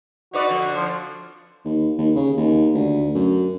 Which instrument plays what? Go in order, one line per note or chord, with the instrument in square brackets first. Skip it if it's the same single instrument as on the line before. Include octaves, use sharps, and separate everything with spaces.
[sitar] D#4 B4 D5 [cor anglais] F#4
[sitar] F2 D3
[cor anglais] F3
[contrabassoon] D#2
D#2
C#3
D#2
D2
F#2